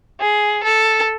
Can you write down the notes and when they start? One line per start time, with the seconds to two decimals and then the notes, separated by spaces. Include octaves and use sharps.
0.20 G#4
0.63 A4